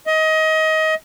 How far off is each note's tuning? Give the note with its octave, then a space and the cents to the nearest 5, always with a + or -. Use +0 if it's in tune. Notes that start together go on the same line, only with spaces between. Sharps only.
D#5 +25